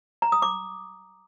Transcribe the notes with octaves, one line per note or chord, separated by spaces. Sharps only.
A#5
D#6
D6